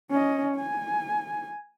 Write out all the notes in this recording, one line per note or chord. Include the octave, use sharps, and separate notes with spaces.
C#4 D#5
G#5